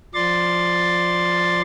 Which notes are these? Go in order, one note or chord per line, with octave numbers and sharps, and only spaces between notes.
F3 D5 C6 A6